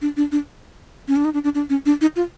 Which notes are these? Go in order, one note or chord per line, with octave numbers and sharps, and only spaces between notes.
D4
D4
D4
C#4
D4
D#4
D4
D4
D4
C#4
D4
D#4
F4